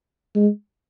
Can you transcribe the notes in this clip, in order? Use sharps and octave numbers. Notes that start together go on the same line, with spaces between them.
G#3